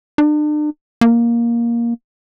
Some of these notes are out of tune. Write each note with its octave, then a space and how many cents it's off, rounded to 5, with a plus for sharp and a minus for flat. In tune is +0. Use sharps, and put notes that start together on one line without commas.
D4 +40
A#3 +10